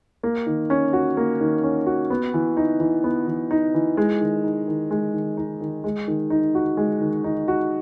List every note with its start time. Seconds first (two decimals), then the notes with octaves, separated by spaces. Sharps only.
0.23 A#3
0.46 D#3
0.70 C#4
0.93 F#4
1.17 A#3
1.41 D#3
1.64 C#4
1.86 F#4
2.10 B3
2.34 E3
2.57 D#4
2.80 E3
3.04 B3
3.27 E3
3.51 D#4
3.74 E3
3.97 G#3
4.20 D#3
4.44 D#4
4.67 D#3
4.91 G#3
5.14 D#3
5.37 D#4
5.61 D#3
5.84 G#3
6.08 D#3
6.30 D#4
6.55 F#4
6.77 G#3
7.01 D#3
7.24 D#4
7.48 F#4